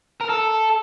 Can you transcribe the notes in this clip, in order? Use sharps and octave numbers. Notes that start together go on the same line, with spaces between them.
A#4
A4